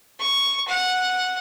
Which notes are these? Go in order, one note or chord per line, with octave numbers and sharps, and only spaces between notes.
C#6
F#5